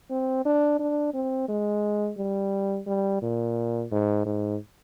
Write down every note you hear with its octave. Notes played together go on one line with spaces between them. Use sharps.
C4
D4
D4
C4
G#3
G3
G3
A#2
G#2
G#2